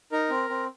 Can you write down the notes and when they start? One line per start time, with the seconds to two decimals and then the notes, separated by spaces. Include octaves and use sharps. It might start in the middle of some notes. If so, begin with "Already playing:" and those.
0.12 D#4 A#4
0.30 C4
0.50 C4